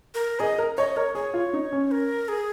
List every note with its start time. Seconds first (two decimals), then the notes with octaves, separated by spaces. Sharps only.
0.15 A#4
0.40 G#4 D#5
0.58 A#4
0.77 C#5 D#5
0.96 A#4 C#5
1.15 G#4 C#5
1.34 F4
1.53 D#4
1.72 C#4
1.91 A#4
2.28 G#4